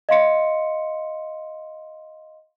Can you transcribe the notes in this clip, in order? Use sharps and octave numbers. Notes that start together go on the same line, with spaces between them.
D#5 F5 C6 C#7